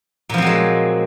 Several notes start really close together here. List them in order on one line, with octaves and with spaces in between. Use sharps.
A#2 F3 C4 F#3 G#3